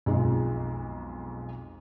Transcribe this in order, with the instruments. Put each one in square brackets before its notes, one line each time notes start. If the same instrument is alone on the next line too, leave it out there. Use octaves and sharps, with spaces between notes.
[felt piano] B1 F2 G#3